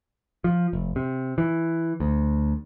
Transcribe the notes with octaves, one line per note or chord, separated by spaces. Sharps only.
F3
F1
C3
E3
D2